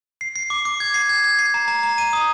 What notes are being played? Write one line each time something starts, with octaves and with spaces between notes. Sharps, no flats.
C7
C7
D6
D6
G#6
C7
G#6
G#6
C7
A#5
A#5
A#5
D#7
D#6